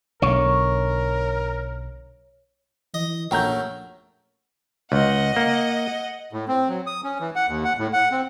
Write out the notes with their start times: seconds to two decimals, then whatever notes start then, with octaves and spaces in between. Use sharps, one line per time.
0.22 B1 D3 A#4 C#5
2.94 E3 D#5
3.31 A#1 F#2 A3 G5 A#5 G6
4.92 C#2 D#5 F#5
5.36 A#3
6.33 A2
6.48 C4
6.69 F#3
6.87 D#6
7.04 C#4
7.20 E3
7.36 F#5
7.48 D#2
7.64 F#5
7.78 A2
7.93 F#5
8.11 C4